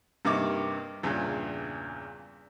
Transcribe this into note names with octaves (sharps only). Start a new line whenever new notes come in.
G2 C3 A#3 D#4 C#6 D6
E2 G2 A#2 C#3